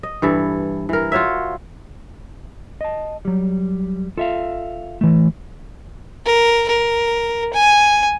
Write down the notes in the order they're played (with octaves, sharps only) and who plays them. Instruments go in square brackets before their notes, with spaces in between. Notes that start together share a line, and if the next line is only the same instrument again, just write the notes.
[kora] D#5
G2 E3 A4
E3 A#4
F4 F#4 C#5 E5
[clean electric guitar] D#5 A5
F#3 G3
[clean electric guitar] F4 [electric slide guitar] A4 E5 F5
[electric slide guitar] E3 A3
[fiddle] A#4
A#4
G#5